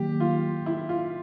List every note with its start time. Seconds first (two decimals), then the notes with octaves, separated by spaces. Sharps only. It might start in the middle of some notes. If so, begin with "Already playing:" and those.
Already playing: D#3 F#3 A#3 G4
0.20 F4
0.66 E4
0.89 F4